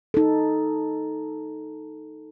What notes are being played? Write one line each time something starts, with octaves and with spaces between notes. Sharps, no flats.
D#4 A4